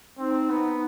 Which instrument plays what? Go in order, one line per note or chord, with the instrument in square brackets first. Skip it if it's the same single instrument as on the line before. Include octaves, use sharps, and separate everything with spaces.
[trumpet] C4 [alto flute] D#4
[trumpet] B3